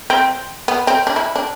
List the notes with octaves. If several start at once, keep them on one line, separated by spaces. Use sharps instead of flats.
C4
B3
C4
D4
E4
D4